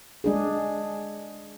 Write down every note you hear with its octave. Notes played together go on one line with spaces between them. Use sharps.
G#3 D4 G#4